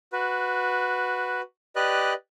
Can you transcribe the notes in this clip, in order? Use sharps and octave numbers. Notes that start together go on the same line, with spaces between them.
F#4 B4
G4 B4 D5 D#5 F#6